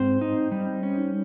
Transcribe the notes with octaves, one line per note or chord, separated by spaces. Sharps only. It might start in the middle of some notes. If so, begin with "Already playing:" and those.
Already playing: G#2 C4 C5
D#4
G3
C#4